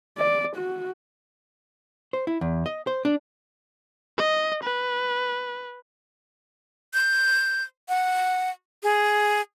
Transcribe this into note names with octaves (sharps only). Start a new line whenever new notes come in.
D5
F#4
C5
E4
E2
D#5
C5
D4
D#5
B4
G6
F#5
G#4